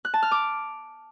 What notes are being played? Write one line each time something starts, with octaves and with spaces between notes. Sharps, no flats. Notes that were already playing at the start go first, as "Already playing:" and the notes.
F#6
A5
F6
D6